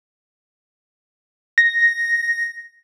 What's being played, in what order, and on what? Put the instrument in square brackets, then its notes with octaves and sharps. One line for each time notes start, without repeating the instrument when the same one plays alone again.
[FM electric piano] A#6